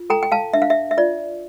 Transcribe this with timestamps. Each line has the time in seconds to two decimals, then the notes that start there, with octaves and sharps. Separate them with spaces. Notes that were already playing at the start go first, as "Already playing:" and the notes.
Already playing: F4
0.10 A4 G5 A#5
0.23 G5
0.32 F5 A5
0.53 D4 E5
0.62 F5
0.70 E5
0.91 E5
0.98 F4 D5